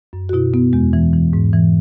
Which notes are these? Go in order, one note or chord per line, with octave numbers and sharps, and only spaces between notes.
F#2
F#4
B2 E4
B2 B3
E2 G#3
E3
E3
G#2
E3